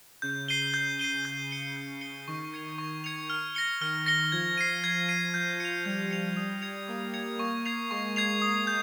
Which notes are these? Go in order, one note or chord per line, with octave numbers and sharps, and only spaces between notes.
C#3 G6
C7 D#7 G7
G6
C7 D#7 G7
G6
C#7 G7
G6
C#7 G7
D#3 C#6
G#6 C#7 F7
C#6
G#6 C#7 F7
F6
A#6 C#7 G7
D#3 F6
A#6 C#7 G7
F3 G#6
C7 D#7
F3 G#6
C7 D#7
F3 G6
C#7 F7
G3 G6
C#7 F7
D#6
G#6 C#7 F7
A#3 D#6
G#6 C#7 F7
A#3 C#6
G#6 C7 F7
G#3 C#6
G#6 C7 F7
D#6
G6